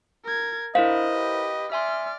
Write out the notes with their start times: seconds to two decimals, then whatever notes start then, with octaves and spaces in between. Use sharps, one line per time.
0.24 A#4 G#6
0.75 D4 E4 A#4 C5 D#5 F5
1.10 G4 B4
1.72 D5 E5 G#5 C6 F6